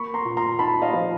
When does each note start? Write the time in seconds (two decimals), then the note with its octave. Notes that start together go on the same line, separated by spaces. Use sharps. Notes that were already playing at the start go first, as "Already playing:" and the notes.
Already playing: A#3 B5 C#6
0.14 A#5 C6
0.25 A#2
0.37 A#5 C6
0.59 D#4 A5 B5
0.82 D#5 F5
0.93 F3